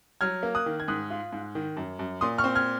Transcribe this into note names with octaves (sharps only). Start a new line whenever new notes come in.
F#3 F6 G#6
A#3
D#6 F#6
D#3
G#6
G#2 D#6 F#6
F4
G#2
D#3
F#2
F#2
A#2 C6 D#6
C#6 F6
C4
F6 G#6